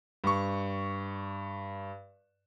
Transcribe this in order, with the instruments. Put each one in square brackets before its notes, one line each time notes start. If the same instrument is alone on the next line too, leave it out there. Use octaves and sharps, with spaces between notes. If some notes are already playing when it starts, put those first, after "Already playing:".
[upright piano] G2 C#6